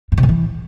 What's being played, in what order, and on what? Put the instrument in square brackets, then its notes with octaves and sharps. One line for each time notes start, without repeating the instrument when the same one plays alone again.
[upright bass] G2
C3
A2
E3